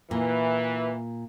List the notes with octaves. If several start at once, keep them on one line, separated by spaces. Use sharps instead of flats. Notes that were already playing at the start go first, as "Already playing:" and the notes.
A#2 E3